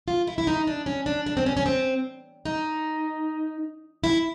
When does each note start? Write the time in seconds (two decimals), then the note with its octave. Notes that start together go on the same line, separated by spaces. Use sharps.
0.08 F4
0.27 E4
0.38 E4
0.47 D#4
0.67 D4
0.86 C#4
1.06 D4
1.26 D4
1.37 C4
1.46 C#4
1.57 C#4
1.66 C4
2.45 D#4
4.04 E4